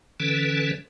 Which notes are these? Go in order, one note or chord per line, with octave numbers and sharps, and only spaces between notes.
D3 E3 C#4 A4 B4